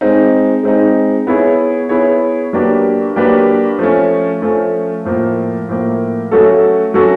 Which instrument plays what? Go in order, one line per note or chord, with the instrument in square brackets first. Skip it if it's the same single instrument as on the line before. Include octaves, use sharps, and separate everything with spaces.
[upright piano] G#3 C4 D#4
G#3 C4 D#4
B3 E4 G#4 C#5
B3 E4 G#4 C#5
F#3 A#3 D4 G4 B4
F#3 A#3 D4 G4 B4
F3 A3 C#4
F3 A3 C#4
A2 F3 A#3
A2 F3 A#3
F#3 A3 C#4 F#4 A4
F#3 A3 C#4 F#4 A4